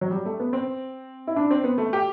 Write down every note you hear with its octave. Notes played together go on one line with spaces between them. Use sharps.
F#3
G3
A3
B3
C4
E4
D4
C4
B3
A3
G4